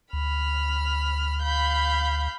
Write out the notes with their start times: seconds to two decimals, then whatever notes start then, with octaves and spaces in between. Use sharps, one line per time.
0.13 D2 B5 F6
1.42 F5 B5 G6